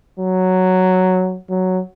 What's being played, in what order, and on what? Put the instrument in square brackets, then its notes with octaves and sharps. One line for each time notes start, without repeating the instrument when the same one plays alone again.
[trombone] F#3
F#3